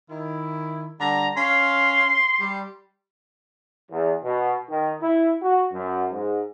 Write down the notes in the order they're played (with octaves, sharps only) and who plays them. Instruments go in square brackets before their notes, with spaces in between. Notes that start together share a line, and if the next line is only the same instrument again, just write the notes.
[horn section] D#3 E4
D3 G3 A#5
[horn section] C#4 F5 [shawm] C6
[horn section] G3
[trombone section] E2
B2
D#3
E4
F#4
F#2
G#2